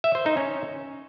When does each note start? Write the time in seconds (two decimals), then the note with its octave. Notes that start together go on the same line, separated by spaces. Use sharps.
0.04 E5
0.15 C5
0.26 D#4
0.37 C#4